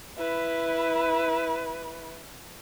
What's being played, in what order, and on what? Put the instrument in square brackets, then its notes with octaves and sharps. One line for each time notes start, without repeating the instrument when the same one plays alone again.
[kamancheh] E4 B4